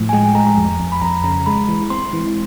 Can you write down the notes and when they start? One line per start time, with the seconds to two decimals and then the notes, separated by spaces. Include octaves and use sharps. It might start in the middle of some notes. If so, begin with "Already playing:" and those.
Already playing: A2 F3
0.09 G#5
0.13 G#3 G5
0.24 G#5
0.35 G#3 A#5
0.47 A#5
0.57 F2
0.80 F2
0.92 B5
1.02 F2 A#5
1.24 C#3 A#5
1.46 G#3 B5
1.68 E3
1.90 C4 C6
2.13 E3